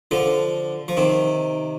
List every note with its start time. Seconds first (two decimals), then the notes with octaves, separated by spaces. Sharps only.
0.11 D3 F3
0.88 F3
0.97 C3 D#3